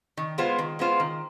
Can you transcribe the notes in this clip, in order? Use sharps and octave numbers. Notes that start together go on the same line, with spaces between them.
D#3
G#3 B3 F4 C5
D#3
G#3 B3 F4 C5
D#3